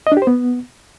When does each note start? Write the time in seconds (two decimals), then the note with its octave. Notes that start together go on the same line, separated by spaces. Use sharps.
0.07 D#5
0.12 D4
0.17 G4
0.22 C5
0.27 B3